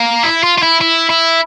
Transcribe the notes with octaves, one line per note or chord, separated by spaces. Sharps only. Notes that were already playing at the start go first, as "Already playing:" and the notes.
Already playing: A#3
E4
F4
F4
E4
E4
E4